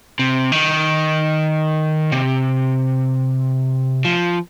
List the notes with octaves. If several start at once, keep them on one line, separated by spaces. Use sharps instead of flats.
C3
D#3
C3
F3